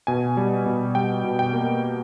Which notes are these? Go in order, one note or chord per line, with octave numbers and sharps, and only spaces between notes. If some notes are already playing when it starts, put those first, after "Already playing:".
B2 G#5
G3
B2
G3 G5
B2
G5
A#3